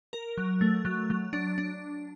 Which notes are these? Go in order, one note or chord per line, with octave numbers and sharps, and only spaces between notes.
A#4
F#3
A3
F#3
F#3
D4
D4